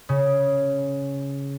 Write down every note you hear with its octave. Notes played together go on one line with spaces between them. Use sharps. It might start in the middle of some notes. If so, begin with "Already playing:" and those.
C#3